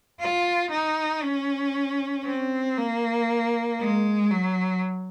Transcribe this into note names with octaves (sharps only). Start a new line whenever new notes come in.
F4
D#4
C#4
C4
A#3
G#3
F#3